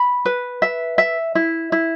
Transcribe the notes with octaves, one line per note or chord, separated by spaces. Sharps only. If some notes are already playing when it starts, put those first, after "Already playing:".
Already playing: B5
B4
E5
E5
E4
E4